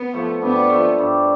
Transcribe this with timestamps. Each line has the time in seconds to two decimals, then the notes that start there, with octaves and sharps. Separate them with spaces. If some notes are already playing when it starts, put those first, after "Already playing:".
Already playing: B3
0.13 F3 A3
0.42 G2 B3
0.70 F3 A3
0.98 G2